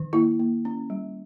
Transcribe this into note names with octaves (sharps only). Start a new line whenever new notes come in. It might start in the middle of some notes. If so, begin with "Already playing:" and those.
Already playing: D#3
A#3 E4
A#3
C#4
G3